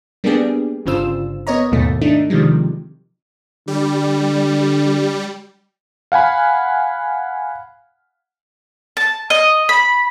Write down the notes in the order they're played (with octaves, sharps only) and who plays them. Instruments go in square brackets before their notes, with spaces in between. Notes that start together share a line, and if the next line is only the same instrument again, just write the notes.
[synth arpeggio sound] G3 A#3 B3 D4 G4 G#4
G1 G2 C#3 F4 C5 E6
B3 A#4 C#5 D#5 A#5
D#2 G#2 B2 A3
A3 D4 D#4
C3 D#3 F3 G3 G#3
[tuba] D3 [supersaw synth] G3
[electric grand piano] F5 F#5 G#5 B5
[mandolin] A5
D#5
B5